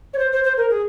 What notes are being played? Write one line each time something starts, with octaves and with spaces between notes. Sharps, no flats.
C#5
C5
C5
C5
A#4
G#4